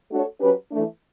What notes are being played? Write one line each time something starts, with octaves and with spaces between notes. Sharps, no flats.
A3 D4 F#4 A4 C#5
F#3 C#4 G4 B4
E3 A3 D4